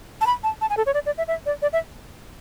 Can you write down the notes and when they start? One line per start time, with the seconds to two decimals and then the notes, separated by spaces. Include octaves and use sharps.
0.21 A5
0.27 B5
0.44 A5
0.61 A5
0.70 G#5
0.77 A4
0.86 C#5
0.94 D5
1.06 D5
1.18 E5
1.28 E5
1.46 D5
1.62 D5
1.73 E5